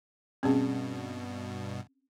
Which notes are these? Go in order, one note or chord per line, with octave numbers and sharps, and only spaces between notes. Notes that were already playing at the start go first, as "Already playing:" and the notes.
G2 B2 C4 C#4 G#4